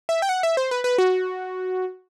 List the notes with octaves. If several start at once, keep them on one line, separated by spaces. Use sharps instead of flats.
E5
G5
F#5
E5
C5
B4
B4
F#4